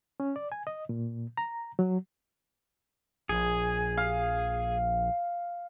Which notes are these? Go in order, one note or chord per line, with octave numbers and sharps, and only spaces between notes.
C#4
D5
G#5
D#5
A#2
A#5
F#3
A#1 G#4
F5